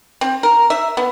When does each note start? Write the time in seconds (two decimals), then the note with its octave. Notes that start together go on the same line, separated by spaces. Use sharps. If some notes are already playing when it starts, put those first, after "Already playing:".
0.21 C4
0.43 A#4
0.70 E5
0.97 B3